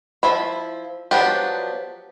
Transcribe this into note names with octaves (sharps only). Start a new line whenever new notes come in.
F3 E4 B5
F3 F#3 B3 D4 G4